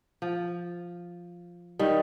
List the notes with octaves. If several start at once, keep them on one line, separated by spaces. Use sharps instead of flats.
F3
D#3 G3